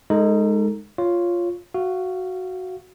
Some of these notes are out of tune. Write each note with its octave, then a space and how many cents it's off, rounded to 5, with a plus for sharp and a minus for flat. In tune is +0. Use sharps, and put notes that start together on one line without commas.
G#3 +0 D#4 +0 A4 +35
F4 +0 C#5 +0
F#4 +0 F5 -20